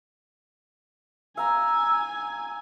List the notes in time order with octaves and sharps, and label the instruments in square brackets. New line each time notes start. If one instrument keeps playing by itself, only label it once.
[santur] F5 A#5 [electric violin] G#5 [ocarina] E6